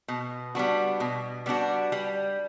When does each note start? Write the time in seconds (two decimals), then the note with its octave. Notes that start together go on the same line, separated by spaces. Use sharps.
0.08 B2
0.55 G3 B3 D4 F#4
1.00 B2
1.46 G3 B3 D4 F#4
1.92 G3